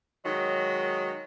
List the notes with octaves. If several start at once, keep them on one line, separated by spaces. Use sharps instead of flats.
D#3 F#3 G#3